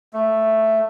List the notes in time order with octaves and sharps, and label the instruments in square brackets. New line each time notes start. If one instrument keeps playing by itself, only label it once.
[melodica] A3